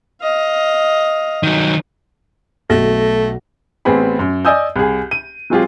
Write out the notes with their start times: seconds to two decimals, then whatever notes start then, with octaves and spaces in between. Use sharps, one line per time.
0.22 D#5 F5
1.43 D#3 F#3
2.70 B1 A3 A#6
3.85 A1 B3 C4 G#4 B5
4.19 F#2
4.45 D5 D#5 G#5 D#6 E6 G6
4.76 C2 G#4
5.11 D#7
5.50 F#3 G#3 C4 F4 G4 G#4